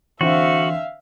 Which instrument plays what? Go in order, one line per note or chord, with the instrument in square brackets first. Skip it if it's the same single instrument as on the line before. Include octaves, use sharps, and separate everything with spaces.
[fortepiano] D3 C4 [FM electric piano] E3 [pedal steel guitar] F#4 [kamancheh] E5 F5